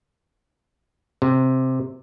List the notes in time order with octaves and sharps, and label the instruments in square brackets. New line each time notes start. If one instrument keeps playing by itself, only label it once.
[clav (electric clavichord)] C3